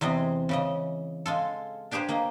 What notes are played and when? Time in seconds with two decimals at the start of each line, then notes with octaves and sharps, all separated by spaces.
0.01 E2 C3 G#3 D#5
0.49 C#3 E3 D#5
1.26 G#3 F4 A4
1.91 D4 G4 G#4 B4 C5
2.08 A#3 A#4 D#5